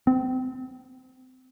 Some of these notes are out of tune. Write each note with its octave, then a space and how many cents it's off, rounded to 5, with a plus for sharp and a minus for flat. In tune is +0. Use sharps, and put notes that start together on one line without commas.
C4 -30